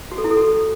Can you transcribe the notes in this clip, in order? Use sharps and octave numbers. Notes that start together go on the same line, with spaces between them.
F#4
A4
E4
A4
F#4